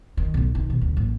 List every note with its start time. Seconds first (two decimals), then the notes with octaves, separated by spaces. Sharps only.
0.17 D#3
0.34 B1 A2
0.55 D#3
0.70 B2
0.81 D2
0.97 A1 A#3